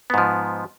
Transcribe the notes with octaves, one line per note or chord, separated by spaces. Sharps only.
G#2 F3 B3